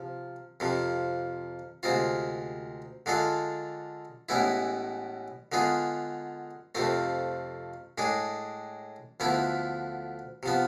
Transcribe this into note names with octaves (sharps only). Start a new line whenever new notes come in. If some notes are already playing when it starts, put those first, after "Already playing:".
Already playing: C3 F3
F2 C3 F3
D2 C3 G#3 C4 F4
D3 G#3 D4 F4 A4
A1 A2 G#3 B3 E4
D3 G#3 B3 F4 G#4
F2 C3 F3 A3 C4
A2 G#3 D4 G#4
D2 D3 F3 B3 E4
C3 F3 B3